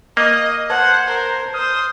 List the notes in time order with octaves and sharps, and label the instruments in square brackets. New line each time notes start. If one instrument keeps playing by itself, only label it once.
[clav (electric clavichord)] A#3 [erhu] D#5
[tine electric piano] B4 A5 G#6 [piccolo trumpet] C5 [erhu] F#5
[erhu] A#4
[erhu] C5 [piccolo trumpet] D#6 [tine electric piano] F6